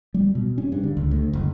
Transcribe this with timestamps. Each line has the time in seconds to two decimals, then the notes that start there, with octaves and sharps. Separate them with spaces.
0.14 G3
0.35 B2
0.58 C#4
0.72 G2
0.83 D3
0.97 C#2
1.11 D2
1.33 F#1